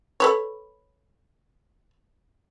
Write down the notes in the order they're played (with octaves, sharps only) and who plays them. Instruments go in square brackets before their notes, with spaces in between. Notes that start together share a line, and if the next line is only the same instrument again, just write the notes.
[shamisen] A4 B4 C#5